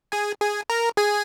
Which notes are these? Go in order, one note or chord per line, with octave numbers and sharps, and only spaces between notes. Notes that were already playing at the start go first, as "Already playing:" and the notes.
G#4 G#5
G#4 G#5
A#4 A#5
G#4 G#5